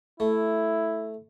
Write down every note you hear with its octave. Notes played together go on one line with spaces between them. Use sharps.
A3 E4